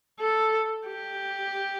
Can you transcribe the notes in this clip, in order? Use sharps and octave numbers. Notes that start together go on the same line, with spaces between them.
A4
G4